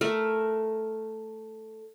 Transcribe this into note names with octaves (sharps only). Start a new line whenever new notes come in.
A3 A#4